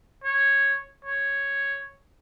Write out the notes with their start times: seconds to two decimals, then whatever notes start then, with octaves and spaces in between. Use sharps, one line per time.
0.24 C#5
1.05 C#5